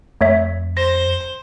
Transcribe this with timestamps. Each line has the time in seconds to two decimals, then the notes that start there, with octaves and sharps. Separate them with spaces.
0.21 F2 A3 C#5 E5
0.77 C5 A#6